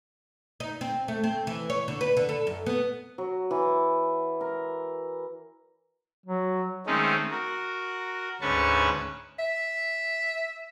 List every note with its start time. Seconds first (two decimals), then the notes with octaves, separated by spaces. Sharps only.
0.60 D#4
0.81 C4
1.08 A3
1.24 C4
1.47 E3
1.70 C#5
1.88 D3
2.01 B4
2.17 D3
2.29 A4
2.47 F#2
2.66 B3
3.18 F#3
3.51 E3
4.41 A#4
6.26 F#3
6.86 D#3 G#3 A3 C4 C#4 D#4
7.31 F#4 A#4
8.41 D2 G#2 C#4 B4 A5 C#6
9.39 E5